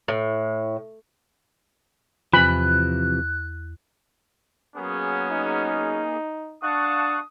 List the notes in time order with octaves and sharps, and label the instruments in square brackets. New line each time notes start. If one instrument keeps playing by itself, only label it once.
[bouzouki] A2
[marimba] E2 [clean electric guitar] C3 E3 F3 [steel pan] B5 [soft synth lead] F#6
[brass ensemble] F#3 B3 C#4 [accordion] A#3 G#4
[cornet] D#4
[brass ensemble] D4 F#5 A5 [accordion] F5 C#6 F#6 [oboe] D#6